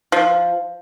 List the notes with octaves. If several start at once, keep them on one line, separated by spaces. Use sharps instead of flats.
F3